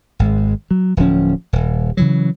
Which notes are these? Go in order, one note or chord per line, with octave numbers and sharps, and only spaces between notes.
G#1 G#3
F#3
D1 F3 C#4
D#1
C#3 E3 F#3